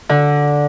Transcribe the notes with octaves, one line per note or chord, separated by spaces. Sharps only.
D3